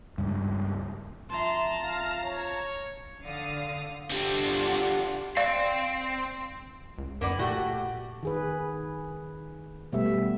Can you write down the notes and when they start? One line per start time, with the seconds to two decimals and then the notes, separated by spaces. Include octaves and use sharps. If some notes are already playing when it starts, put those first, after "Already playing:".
0.18 C#2 G2
1.30 F2 E5 A5 A#5 C6
1.83 F5
2.24 C#5
3.22 D3 F5 D#6
4.10 C2 D3 G3 C4 D4 F4 F#4
5.37 C4 D5 F5
6.98 C#2
7.21 F#2 A#3 B3 D5
7.38 A#2 A3 F#4 G4
8.23 D#3 G#4 B4
9.92 B2 G3 A3 B3 E5